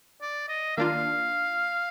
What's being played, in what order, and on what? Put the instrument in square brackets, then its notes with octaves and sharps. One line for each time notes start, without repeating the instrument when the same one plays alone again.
[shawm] D5
D#5
[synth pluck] D#3 A#3 D4 F4 [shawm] F5